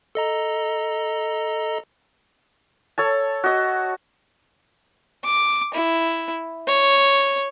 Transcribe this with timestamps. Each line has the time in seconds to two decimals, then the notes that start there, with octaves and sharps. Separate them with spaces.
0.15 A4 D#5 A#5
2.98 A4 C#5 A5
3.44 F#4 D#5
5.25 D6
5.74 E4
6.67 C#5